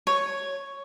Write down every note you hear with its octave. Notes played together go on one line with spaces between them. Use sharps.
C#5